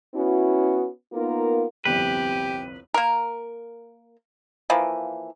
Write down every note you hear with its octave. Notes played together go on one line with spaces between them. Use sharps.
B3 C#4 E4 F#4
A#3 B3 D#4 F4 A#4
G1 C2 F2 G4 B4
A#3 A#4
E3 F3 A#3